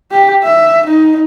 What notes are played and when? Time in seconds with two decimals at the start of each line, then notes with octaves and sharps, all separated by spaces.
0.11 G4
0.43 E5
0.86 D#4